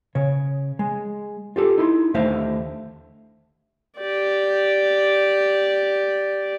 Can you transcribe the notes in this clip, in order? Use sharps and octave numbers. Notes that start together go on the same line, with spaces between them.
C#3 C#5
G#3
F4 G4 A4
D#4 E4 C6
D#2 D3 A3 C5 E5 F5
G4 D5